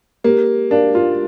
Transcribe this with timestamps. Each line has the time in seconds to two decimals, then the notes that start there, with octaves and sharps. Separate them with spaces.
0.24 A#3 G4
0.70 D4 A#4 F5
0.95 F4